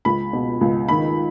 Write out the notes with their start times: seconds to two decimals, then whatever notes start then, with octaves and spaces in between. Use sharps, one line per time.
0.05 C#2 B5
0.33 B2
0.61 C#2
0.88 D#3 B5